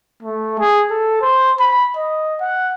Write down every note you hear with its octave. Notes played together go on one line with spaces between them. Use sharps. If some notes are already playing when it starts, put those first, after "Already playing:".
A3
G#4
A4
C5
B5
D#5
F#5